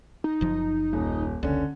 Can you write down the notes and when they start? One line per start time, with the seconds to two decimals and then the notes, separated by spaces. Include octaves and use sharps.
0.24 D#4
0.41 F#1 F3
0.93 D#1
1.43 F1 C#2 D3 C#4